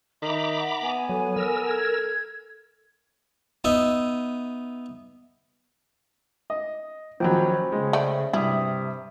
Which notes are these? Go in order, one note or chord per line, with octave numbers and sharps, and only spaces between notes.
D#3 E5 A#5 B5 D6
F#5
B3 G#5
F#3 A4
A#4 E6
A4 G#6
B3 D#4 E5
D#5
A#1 D#2 F#3 C#4 C5 G5 B5
C#3 G#3
A3 D5
G2 C3 E4 E5 D#6